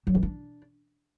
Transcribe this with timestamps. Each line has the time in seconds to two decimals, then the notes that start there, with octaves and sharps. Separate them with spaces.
0.07 F#3
0.15 E3
0.23 D4